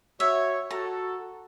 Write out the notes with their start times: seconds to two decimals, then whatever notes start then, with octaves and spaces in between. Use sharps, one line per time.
0.20 F#4 C#5 E5
0.71 F#4 A4 A#5